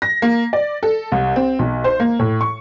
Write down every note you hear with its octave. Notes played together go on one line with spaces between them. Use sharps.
A#6
A#3
D5
A4
C2
C4
B1
C5
A#3
A2
C#6